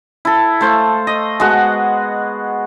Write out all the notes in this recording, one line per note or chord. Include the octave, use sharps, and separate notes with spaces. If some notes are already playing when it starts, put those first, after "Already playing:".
E4 A4
A3 C5 F5
D#5
G#3 B3 F#4 F#5